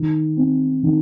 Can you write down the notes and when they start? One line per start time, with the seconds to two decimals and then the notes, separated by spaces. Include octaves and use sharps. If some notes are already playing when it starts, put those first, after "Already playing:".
Already playing: D#3
0.37 C4
0.83 D#3